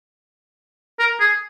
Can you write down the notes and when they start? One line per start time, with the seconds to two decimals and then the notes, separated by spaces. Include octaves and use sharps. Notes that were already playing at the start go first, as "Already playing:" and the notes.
0.99 A#4
1.20 G#4